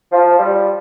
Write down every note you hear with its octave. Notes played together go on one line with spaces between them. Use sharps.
F3
G3